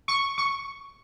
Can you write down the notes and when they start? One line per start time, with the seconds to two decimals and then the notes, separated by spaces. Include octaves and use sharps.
0.08 C#6
0.38 C#6